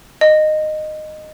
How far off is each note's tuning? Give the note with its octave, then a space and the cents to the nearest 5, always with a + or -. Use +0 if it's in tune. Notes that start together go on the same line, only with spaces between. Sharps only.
D#5 -15